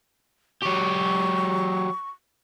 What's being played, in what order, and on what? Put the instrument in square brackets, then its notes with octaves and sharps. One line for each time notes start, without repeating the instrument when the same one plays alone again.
[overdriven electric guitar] F#3 G4 [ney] C#6